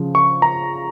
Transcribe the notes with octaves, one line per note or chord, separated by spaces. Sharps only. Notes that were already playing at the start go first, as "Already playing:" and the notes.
Already playing: C#3 F3
C#6
A#5